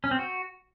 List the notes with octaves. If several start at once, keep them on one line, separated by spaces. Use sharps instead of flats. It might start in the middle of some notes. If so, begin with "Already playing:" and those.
C#4
C4
F#4